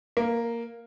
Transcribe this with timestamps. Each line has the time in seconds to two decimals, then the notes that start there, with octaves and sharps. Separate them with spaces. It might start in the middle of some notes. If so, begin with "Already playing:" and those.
0.17 A#3